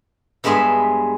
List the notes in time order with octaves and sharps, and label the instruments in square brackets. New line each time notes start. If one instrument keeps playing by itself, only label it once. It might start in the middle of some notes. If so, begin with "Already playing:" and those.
[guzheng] G2 G#3 B3 E5 B5